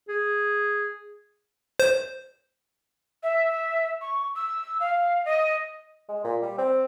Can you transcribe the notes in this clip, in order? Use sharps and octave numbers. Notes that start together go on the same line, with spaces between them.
G#4
C5
E5
C#6
E6
F5
D#5
G#3
A#2
G3
C4